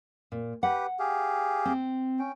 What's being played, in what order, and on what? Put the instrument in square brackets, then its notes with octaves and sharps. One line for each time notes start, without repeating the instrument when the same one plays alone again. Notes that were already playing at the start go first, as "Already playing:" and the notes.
[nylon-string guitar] A#2
[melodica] G4 B4 [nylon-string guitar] F#5
[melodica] G4 G#4 F5
[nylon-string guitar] C4
[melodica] C#4 G5